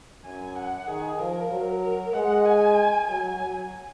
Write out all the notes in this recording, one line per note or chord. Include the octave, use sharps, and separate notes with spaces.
F#2 G#5
F#5
D#3 G#4
F3 A#4
F#3
A#4
G#3 F#5
G#5
F#3 G#5
F#3